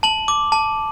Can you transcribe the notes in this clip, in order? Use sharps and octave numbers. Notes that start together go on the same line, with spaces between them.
A5 F#7
D6
A5